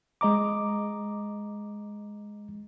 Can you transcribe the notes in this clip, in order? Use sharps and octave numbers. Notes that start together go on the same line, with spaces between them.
G#3 D#5 A#5 D6